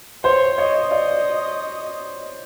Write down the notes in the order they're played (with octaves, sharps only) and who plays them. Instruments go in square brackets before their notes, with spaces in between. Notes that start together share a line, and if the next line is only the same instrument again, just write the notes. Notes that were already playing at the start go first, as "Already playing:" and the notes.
[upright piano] C5 [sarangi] C#5
[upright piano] C#5 [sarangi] D#5
[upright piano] D5 [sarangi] D#5